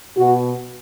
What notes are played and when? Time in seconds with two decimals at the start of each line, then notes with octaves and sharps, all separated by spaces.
0.17 B2 F#4